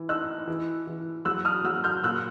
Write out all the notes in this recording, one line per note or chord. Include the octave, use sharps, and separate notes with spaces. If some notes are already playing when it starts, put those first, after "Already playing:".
Already playing: E3
D#4 E6 F#6
E3
E3
F#3 E6 F#6
D#6 F6
F#3 E6 F#6
F6 G6
A#2 E6 F#6